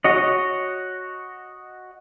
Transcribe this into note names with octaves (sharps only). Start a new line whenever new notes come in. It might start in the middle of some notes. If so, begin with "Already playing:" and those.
F#4 C#5 D#5